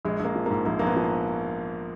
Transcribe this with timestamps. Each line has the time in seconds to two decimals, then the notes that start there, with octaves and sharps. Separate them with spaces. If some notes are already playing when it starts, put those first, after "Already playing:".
0.05 A#1 G#3
0.20 A#1 A#3
0.35 F3
0.46 G#2 A#3
0.65 A#1 A#3
0.79 A#1 A#3
0.87 B3
0.96 F3